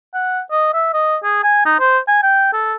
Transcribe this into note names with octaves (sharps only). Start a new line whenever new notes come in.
F#5
D#5
E5
D#5
G#4
G#5
D#4
C5
G#5
G5
A4